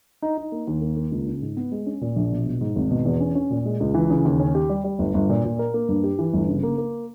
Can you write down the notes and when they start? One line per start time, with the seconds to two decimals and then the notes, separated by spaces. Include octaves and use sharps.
0.22 D#4
0.38 D#4
0.52 A#3
0.67 D#2
0.82 A#3
0.97 A#3
1.12 C#2
1.27 C#3
1.42 G#2
1.57 B3
1.72 G#3
1.86 C#4
2.01 A#2
2.16 A#1
2.31 B2
2.46 B2
2.61 G#2
2.76 G#1
2.91 B2
3.05 E2
3.21 C#4
3.35 C#4
3.50 A#2
3.65 G#3
3.80 C#2
3.94 E3
4.10 C#3
4.25 D#2
4.40 C#4
4.55 G4
4.69 G3
4.84 G3
4.99 G1
5.14 G1
5.29 A#2
5.44 A#2
5.59 A#4
5.74 A#3
5.89 G2
6.04 G4
6.19 E3
6.33 G1
6.49 C#3
6.63 A#3
6.78 A#3